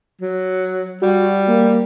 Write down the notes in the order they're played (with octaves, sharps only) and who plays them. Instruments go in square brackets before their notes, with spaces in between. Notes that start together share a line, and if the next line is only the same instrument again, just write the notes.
[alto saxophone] F#3
[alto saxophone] G3 [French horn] F#4
[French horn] A#3